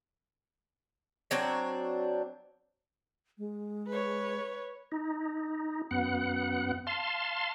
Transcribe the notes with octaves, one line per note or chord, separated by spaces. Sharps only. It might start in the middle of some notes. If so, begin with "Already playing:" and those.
F#3 C4 D4 C#5
G#3
B4 C#5
D#4
F#2 B3 F#5
F5 A5 C6